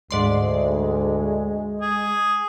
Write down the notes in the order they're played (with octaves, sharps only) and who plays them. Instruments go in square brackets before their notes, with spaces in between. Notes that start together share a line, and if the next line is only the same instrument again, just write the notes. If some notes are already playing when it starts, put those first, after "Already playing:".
[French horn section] D2 [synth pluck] G#2 D5 C6 [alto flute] G#3
[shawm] G#4